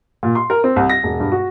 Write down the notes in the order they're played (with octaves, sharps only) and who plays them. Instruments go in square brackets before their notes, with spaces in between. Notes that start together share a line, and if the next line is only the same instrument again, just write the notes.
[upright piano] A#2
C6
A#4
C4
C2
A#6
E1
G2
F#4